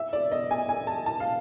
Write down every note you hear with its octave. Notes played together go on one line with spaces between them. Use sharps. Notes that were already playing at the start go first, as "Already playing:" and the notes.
Already playing: E5
D5
D#5
G#5
G#5
A5
A5
F5